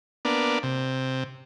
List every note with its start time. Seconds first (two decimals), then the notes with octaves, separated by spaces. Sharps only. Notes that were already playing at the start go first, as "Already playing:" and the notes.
0.25 A#3 B3 D4
0.63 C3